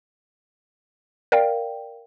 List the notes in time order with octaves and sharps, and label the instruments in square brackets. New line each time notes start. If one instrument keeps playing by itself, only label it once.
[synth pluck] A#4 D5 F5 G5